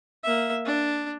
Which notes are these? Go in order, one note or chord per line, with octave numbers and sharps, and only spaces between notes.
A#3 E5
D4